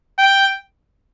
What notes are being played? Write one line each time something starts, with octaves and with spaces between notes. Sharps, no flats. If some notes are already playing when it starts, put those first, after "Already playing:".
G5